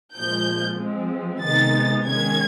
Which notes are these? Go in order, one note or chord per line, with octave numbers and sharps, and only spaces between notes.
A#2 F3 G#3 G6
F3 G#3 C4
C3 D#3 G#3 B3 D#4 A6
D#3 G#3 C#4 G#6